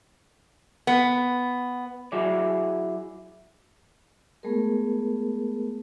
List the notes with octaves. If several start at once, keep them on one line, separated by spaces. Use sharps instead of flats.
B3
F#3 E4 G#4 D5
G#3 A3 B3 G#4 A#4